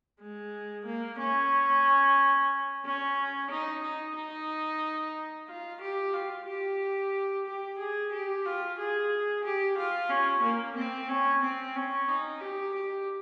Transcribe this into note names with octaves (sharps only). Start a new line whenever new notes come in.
G#3
A#3
C#4
C#4
D#4
D#4
D#4
F4
G4
F4
G4
G4
G#4
G4
F4
G#4
G4
F4
C#4
A#3
C4
C#4
C4
C#4
D#4
G4
G4